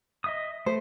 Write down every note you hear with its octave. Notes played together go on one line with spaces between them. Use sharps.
D#5 E5 D#6
A3 C5